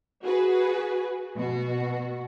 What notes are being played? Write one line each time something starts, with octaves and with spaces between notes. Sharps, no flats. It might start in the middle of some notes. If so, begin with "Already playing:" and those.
F#4 G#4 B4
B2 F#4